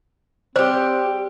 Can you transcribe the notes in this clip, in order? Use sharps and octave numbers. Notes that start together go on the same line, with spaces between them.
G3 C4 G4 C5